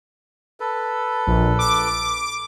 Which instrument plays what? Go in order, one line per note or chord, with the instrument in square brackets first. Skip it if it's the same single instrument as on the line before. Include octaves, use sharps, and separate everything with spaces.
[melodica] A4 B4
[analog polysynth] A#1
D6